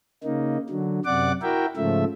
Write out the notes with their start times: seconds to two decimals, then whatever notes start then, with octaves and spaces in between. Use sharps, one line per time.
0.24 C#3 A#3 D#4
0.70 D3 F#3
1.05 F#2 C3 D5 F#5 D6
1.42 E4 F#4 A#4 E5 G5
1.76 G#2 C#3 F3 A3 E5